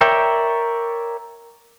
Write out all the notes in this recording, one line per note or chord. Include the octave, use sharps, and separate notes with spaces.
A#4 C#5 D5 E5 G5